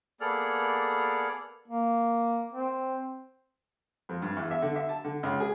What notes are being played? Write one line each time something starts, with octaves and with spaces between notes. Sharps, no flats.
A#3 B3 G#4 A4 D5 F6
A#3
C4
F2
G2
E2
E5
D3
E5
A5
D3
C#2
G#4